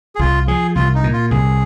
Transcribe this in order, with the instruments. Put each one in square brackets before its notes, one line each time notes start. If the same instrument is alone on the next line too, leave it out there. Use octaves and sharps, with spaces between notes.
[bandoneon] G#4
[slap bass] C2 [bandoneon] F4
[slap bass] F3 [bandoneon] G#4
[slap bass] C2 [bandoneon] F4
[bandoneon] D#4
[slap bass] A#2
[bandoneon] F4
[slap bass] C2 [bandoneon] G#4